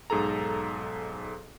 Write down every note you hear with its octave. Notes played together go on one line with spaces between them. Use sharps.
B1 G#2 G#4 A4 A#5